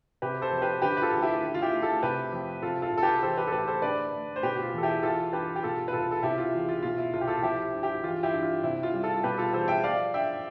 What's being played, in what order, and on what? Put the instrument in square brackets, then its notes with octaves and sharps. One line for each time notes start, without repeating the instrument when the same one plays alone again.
[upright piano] C3 G4 B4
A4 C5
F2
C5
G4 B4
D3 G4 B4
B4
F4 A4
D2
E4 G4
D3
F4
E4 G4
A3
F4 A4
C3 G4 B4
F2
C3 F4 A4
F4 A4
C2
A4
G4 B4
E3 A4 C5
G4 B4
A4
A2 G4 B4
A4 C5
D3 B4 D5
A3
C5
B2 G4 B4
G4
F4
E2
A4
E4 G4
E3 F4 A4
G2 G4 B4
G4
B2 F4 A4
B4
C2 F4 A4
A4
C3 E4 G4
F4
E2 F4
F4
B2 F4
E4
C2 F4
G4
F4 A4
F3 E4 G4
G2
E4 G4
E3 F4
E4 G4
G2
F4
C3 E4
F4
G3
F4 A4
B2 G4 B4
F4 A4
E2 A4 C5
E5 G5
F3 D5 F5
G2 E5 G5